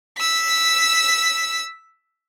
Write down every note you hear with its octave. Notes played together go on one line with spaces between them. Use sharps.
E6 B6